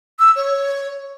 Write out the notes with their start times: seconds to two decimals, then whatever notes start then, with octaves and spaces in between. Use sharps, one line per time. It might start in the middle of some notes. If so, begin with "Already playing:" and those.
0.19 E6
0.36 C#5